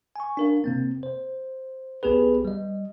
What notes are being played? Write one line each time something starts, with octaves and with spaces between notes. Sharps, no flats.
G#5 C#6
D4 A#4 F5
C3 A#3 C4
C5
B1 B3 G4 G#4 B4
G3 D#5